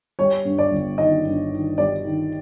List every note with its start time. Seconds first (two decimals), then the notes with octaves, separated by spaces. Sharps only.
0.19 G3 C#5
0.45 G2
0.58 D5
0.71 G1
0.98 D#3 D#5
1.25 G2
1.51 D#3
1.78 G3 D5
2.04 D#3